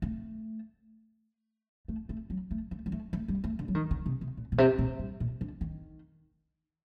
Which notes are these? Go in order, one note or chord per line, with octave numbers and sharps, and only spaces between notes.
A3
A3
A3
F#3
A3
A3
G3
A3
A3
G3
A3
D3
F#3
D#3
D3
C3
C3
A#2
A#2
C3
A#2
G2
A#2
D3
D#3